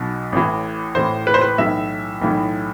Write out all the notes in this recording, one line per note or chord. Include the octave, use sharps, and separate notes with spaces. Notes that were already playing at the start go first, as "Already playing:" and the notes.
Already playing: B1 B2
A1 A2 E3
A1 A2 E3 C5
B4
C5
B4
B1 A2 E3 E5
B1 A2 E3